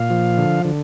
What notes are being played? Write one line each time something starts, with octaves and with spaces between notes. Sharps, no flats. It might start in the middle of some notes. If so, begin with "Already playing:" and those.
Already playing: A#2 F5
F3
D3
D3